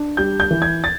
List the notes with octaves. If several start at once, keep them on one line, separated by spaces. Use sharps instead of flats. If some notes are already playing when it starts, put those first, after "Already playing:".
Already playing: D4
G3 G6
G6
E3
G#6
A6